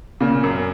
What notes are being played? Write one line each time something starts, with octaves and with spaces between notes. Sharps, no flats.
A#2 C#3
F#2